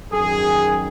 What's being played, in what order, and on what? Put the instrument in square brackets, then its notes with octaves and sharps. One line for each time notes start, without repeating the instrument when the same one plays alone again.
[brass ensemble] F#2 D#3 G#4